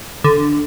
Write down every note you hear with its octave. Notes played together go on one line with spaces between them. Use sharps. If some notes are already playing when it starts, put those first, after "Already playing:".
D3